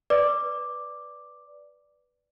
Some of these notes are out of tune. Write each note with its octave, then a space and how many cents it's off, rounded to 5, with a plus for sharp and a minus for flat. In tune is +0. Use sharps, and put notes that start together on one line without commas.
B4 +0 D5 +0 D6 +0